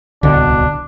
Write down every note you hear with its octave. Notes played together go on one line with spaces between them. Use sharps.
D1 C2 B2 D3 D4